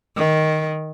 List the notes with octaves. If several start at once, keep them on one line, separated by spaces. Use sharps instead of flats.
D#3